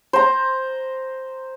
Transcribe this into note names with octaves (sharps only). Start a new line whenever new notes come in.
C5 A#5